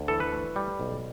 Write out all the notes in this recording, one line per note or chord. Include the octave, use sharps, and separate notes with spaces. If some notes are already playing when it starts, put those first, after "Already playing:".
Already playing: D2
E3 A4
B4
A3
G3
B1